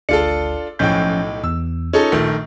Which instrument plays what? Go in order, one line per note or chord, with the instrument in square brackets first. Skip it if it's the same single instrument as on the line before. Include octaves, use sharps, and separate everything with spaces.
[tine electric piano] G#1 D2 C#7 [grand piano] D4 F4 A4
[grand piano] B1 A2 G5 [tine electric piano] F3 C#4 G6
[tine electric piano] E2 [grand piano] E6
[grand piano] C#4 D#4 A4 [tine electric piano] F4
[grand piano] A#1 D#3 A3